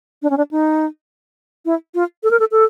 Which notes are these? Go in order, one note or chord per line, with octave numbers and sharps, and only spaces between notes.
D4
C#4
D4
D#4
E4
F4
A4
A#4
A4
A4